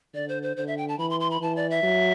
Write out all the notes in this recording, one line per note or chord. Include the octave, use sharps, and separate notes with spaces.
D3 D5
C5
C5
D3 C5
E5
G5
A5
E3 B5
C6
C6
B5
E3 A5
D5
E5
F#3